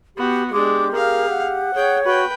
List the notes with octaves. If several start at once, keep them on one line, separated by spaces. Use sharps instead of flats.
B3 F#4 G4
G#3 D4 G4 D6
G#4 A#4 F5
F#5
G#4 C#5 G5
F#4 B4 G5